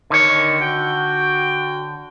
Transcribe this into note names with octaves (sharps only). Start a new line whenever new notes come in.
D3 D#3 C#5
F#4 G5